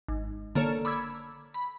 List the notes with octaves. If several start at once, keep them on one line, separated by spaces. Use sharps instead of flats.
G#1
D3 A#3 A4 C#5
B5 D6 E6 G#6
B5